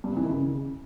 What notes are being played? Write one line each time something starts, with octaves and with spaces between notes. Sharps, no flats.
G2
C3
E3
D#3
C#3